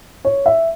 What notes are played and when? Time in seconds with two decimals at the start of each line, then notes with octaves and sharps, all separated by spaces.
0.25 C#5
0.46 E5